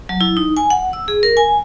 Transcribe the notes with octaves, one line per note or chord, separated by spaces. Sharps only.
F#3
E4
D#4
G#5
F#5
E6
G#4
A#4
G#5